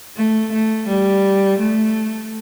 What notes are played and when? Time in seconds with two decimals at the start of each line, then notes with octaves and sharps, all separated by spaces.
0.17 A3
0.53 A3
0.88 G3
1.59 A3